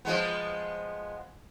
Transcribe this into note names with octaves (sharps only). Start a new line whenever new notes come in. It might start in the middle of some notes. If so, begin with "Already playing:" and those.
F3 G#3 B3